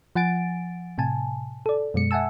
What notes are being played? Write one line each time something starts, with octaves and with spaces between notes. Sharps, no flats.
F3 F#5 G#5 A6 D7
A2 C3 G#5 A5
A4 D5
F#2 B2 G#3 C#7
E5 F#5 G#5 A5 E6